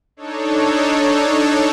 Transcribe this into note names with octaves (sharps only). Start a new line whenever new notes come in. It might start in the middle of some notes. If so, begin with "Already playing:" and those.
D4 D#4 A4 C#5